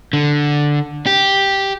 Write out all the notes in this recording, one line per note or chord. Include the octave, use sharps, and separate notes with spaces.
D3
G4